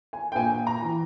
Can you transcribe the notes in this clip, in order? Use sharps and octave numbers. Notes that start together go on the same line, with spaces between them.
G#5
G5
A#1 G#5
A#5
E3